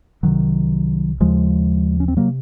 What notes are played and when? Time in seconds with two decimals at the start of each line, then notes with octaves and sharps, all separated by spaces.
0.23 C2 C3 D#3 F#3
1.20 D#2 C#3 F3 G#3
2.00 C#4
2.08 C4
2.17 C3 F#3 A#3